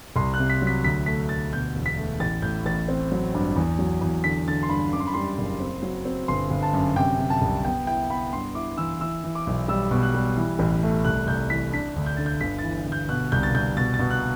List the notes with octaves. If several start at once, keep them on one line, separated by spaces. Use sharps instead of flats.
C2 C6
F#6
C3
B6
F#3
B6
D2 B6
A3 B6
D2 A6
B2 G6
E1
B6
A3
A1 A6
A2 G6
A1 A6
C4
F#3
G2
E2
F#3
E2
D3 B6
D3 A6
C6
G2 B5
F#2 D6
C6
B5
G3 C6
F#1
C4
F#3
C4
G1 C6
G1
A5
F#2
C3 G5
C3
A5
C2
B3 G5
E4 G5
B3 B5
G2 C6
E4 D6
E3 E6
E3 E6
E3
D6
B1
G3 E6
B2
F#6
G3
E3
A1
A3
C2 F#6
C2 G6
E3 B6
D4 B6
D2
G6
D3 A6
G6
G1 B6
E3 A6
G1
G6
B2 F#6
C2 G6
A6
C2 G6
B2 A6
A6
B2
F#6